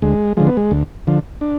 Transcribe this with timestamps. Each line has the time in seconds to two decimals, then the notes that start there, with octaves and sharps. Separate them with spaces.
0.02 D2 G#3
0.37 D3 F3 G#3
0.47 B3
0.57 G#3
0.71 D2
1.07 D3 F3
1.41 D4